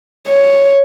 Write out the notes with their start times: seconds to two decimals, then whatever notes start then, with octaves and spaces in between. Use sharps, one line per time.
0.27 C#5